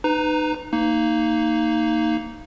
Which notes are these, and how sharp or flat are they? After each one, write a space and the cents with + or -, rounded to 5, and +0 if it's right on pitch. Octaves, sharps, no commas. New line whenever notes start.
D#4 -25 B4 +20 A#5 +0
A#3 -15 D#4 +0